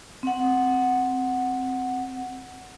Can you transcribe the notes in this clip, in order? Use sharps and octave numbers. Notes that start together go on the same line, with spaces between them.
C4 F#5